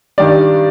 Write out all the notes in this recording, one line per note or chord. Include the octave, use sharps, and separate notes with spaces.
G2 D#3 G3 D4 D5